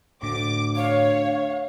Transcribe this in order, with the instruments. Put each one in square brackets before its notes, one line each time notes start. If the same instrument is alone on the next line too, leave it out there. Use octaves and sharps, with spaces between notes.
[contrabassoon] D2 [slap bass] A2 [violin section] D6
[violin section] C#5 [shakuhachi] F5